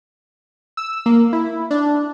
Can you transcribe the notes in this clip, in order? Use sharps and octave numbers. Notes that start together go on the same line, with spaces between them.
E6
A#3
E4
D4